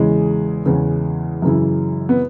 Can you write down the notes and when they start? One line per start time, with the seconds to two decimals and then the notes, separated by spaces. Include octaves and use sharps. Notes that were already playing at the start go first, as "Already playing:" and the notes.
Already playing: E2 C#3 E3 G#3
0.66 E2 C#3 E3
1.42 F#2 C#3 E3
2.09 B3